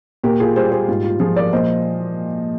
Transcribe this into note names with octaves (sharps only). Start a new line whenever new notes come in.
A#2 G4 A#4
F4 G#4
G3 G#4 C5
G#4 C5
G#2 F4
F4
F3 F4 G#4
A#4 D5
A#2 C5 D#5